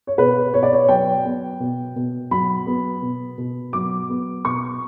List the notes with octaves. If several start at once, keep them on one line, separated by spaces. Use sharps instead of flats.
C#5
B2 B4
B2 C#5
D5
C#5
F#3 G5
B3
B2
B2
F#3 B5
B3
B2
B2
F#3 D6
B3
B2 C#6